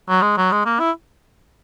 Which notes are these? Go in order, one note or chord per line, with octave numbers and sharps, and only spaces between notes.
F#3
G#3
F#3
G#3
A#3
E4